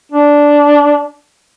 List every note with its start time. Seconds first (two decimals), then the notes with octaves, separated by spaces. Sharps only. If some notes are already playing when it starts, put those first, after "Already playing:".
0.12 D4